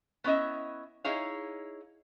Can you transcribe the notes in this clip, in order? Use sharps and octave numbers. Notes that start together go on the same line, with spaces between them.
B3 C#4 E4 D#5 E5
D#4 E4 G#4 C#5 F5